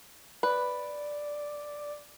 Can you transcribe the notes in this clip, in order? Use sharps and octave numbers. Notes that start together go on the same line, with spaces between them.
B4 D5